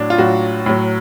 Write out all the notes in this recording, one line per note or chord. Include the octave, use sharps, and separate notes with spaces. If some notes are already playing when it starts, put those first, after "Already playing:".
Already playing: A2 F#3 D4
F4
A2 F#3 F#4
A2 F#3